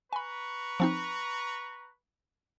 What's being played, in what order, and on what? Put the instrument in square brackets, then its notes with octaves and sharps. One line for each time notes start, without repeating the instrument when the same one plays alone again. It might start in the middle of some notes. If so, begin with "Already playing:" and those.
[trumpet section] B4 A#5 C#6 [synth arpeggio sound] G#5 B5
[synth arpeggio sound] F3 C4 D#4